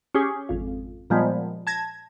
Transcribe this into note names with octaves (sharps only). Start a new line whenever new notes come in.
C#4 G4 G#4
G#1 F2
A#2 F3 G3 G#3 B3
A5 G#6 A#6